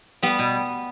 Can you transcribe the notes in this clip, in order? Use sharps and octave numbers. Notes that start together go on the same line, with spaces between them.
G3 B3
B2